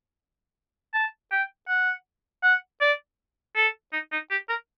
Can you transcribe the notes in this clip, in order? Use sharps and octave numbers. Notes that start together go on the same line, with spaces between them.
A5
G5
F#5
F#5
D5
A4
D#4
D#4
G4
A#4